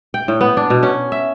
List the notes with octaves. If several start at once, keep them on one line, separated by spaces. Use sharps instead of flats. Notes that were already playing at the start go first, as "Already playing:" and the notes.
G5
A2
B3
D4
B2
C#4
E5